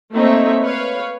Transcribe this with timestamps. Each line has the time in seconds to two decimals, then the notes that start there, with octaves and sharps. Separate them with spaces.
0.12 A3 A#3 C4 D#4 C#5 E5
0.60 B4 C#5 F5